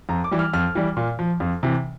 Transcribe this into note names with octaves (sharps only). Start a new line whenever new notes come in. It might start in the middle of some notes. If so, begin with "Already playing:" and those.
F2 A#5
D6
E3 G3
F6
F2 F6
E3 G3
A#2
F3
F2
C3 E3